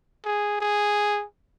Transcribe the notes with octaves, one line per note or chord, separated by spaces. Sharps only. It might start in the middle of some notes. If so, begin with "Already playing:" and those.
G#4
G#4